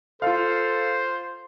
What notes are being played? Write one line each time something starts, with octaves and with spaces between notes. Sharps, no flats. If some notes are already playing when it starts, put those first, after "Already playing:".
F4 A4 C5 F5